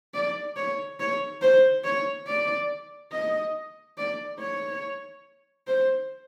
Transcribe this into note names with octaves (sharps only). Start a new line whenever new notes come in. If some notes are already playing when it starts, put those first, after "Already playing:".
D5
C#5
C#5
C5
C#5
D5
D#5
D5
C#5
C5